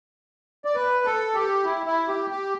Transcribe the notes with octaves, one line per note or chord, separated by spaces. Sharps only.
D5
B4
A4
G4
E4
E4
G4
G4